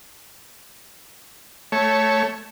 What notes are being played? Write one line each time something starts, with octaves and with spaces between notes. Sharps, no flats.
A3 C#5